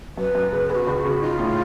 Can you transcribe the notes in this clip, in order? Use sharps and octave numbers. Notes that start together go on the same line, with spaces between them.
F#2 B4
F#2
C#3
B3 G#4
F#4
C#2
C#3
D#4 F4
A2